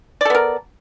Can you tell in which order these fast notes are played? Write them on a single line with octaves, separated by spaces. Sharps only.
D5 A4 B3 A#4